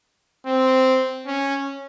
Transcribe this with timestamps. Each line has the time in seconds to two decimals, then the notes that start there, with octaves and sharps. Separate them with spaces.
0.47 C4
1.27 C#4